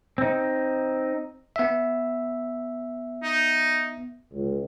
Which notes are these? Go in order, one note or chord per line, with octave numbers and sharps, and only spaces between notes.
C4 D#4
B3 E5
D#4
C#2